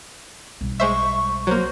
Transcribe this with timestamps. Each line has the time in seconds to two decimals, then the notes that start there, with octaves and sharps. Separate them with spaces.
0.61 B1 G3
0.80 G#3 C5 E5 C#6
1.47 F#3 A#3 C5